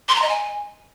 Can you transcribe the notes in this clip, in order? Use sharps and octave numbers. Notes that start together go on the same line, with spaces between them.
C6
A#5
D#5
G#5